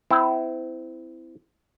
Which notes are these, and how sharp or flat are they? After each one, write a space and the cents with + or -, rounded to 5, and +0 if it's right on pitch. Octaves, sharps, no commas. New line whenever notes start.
C4 -30 E4 +0